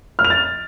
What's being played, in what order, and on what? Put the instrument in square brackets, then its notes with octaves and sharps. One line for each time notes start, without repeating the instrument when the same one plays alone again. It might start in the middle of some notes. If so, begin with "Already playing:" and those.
[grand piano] F6
F7
A6